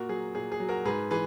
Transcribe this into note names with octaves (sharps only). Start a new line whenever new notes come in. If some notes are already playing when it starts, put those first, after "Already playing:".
Already playing: A#2 F#4 A#4
F#3 G#4
A#2 G#4
G#4
F#3
F#4 A#4
G#2 G#4 B4
E3 G#4 B4